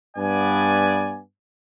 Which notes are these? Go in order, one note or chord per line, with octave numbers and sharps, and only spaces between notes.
G2 B3 D5 G#5